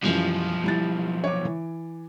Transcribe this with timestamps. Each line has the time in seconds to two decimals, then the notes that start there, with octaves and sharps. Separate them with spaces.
0.03 B1 F#2 E3 F3 G3
0.64 G3 E4 A6
1.24 C#5 D6
1.45 E3